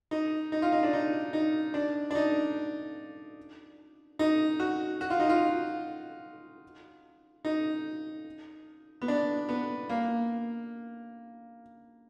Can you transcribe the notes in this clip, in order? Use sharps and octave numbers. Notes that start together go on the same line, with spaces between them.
D#4
D#4
F4
D#4
D4
D#4
D#4
D4
D4
D#4
D#4
F#4
F#4
F4
D#4
F4
D#4
B3
D4
B3
A#3